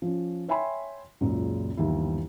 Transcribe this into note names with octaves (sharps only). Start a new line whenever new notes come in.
F3 C#4
C#5 E5 G5 G#5 B5 C6
C#2 F#2 A#2 C#3
G1 D#2 D#3 E3 E4